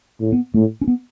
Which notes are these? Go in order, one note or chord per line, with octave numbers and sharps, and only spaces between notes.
A2
B3
A2 A3
C#4
B3